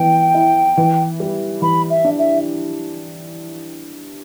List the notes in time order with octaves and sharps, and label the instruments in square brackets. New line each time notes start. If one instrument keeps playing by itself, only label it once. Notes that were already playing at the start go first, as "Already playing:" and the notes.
Already playing: [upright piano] E3 B3 [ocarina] G5
[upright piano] E4
E3
G3
[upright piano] E3 [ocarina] B5
[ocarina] E5
[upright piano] D4
[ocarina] E5